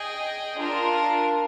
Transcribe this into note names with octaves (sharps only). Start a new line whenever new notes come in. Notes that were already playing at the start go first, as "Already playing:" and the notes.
Already playing: G#4 D#5 G5
D4 F4 A#4